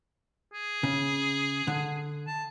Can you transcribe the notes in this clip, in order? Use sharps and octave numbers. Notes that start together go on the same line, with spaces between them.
G#4
C#3
D3
A5